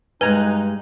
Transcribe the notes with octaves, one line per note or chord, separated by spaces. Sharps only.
G2 G#3 D#4 B4 G#5 A#5 F#6 G#6